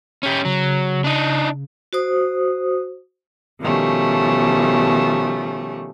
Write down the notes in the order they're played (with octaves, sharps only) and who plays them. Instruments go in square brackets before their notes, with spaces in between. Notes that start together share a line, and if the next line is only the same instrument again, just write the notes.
[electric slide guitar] C#4 G4
[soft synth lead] C#3 [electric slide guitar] F#3
[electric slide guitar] D4 D#4
[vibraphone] F#4 C5 D#6
[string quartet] B2 D#3 F3 G3 A3 C#4